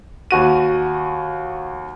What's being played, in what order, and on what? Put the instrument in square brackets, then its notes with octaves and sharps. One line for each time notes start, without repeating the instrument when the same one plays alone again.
[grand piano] D#2 F#4 D#7